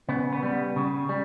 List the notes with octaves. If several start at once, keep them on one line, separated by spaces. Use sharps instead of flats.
C#3 B3
B3
G3 B3
C#3
G3